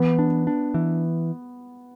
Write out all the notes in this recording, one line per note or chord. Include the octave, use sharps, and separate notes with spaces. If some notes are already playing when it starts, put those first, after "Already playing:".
Already playing: E3 B3
D4
D4
E3